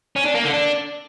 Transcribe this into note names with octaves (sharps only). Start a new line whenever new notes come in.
C#4
D4
A#3
D3
D4